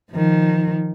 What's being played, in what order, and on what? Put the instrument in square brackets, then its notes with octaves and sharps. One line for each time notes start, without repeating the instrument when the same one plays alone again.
[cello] D#3 F3